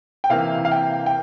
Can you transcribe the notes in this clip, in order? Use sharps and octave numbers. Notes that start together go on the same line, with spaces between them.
G5
C3 E3 A#3 F5
F5
G5
G5